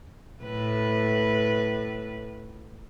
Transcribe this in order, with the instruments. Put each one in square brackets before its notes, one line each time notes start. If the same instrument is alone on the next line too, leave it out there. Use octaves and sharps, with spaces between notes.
[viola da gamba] A2 B4